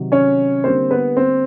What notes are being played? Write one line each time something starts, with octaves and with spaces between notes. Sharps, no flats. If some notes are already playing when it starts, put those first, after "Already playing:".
Already playing: C3 D#3 F#3
C#4 C#5
D3 G3 A#3 C4 C5
B3 B4
C4 C5